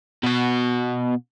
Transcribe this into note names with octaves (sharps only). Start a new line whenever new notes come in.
B2 F#4